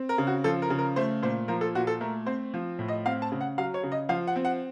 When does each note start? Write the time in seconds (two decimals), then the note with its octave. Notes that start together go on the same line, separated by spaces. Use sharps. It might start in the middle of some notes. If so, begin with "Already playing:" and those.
Already playing: C4
0.09 A#4
0.18 C#3
0.27 F#4
0.44 F3 A4
0.62 A#4
0.70 C#3
0.78 A#4
0.96 A3 C5
1.22 A#2 C5
1.48 F3 A#4
1.61 A4
1.75 A#2 F#4
1.87 A4
2.01 A3 A#4
2.26 C4 C5
2.54 F3
2.79 A2
2.88 D#5
3.06 C4 F5
3.22 A5
3.32 C#3
3.41 F#5
3.58 F#3 F5
3.74 C#5
3.83 C#3
3.92 D#5
4.09 F3 F5
4.27 F#5
4.36 C4
4.45 F#5